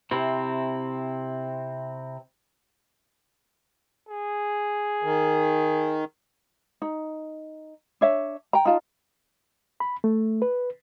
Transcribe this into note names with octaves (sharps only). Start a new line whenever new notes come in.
C3 C4 E4
G#4
D#3
D#4
D4 C#5 E5
G5 A#5
D#4 F4 A5
B5
A3
B4